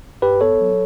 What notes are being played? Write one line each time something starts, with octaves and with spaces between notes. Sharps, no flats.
G2 G4 B4
B3 A4 C#5
F#3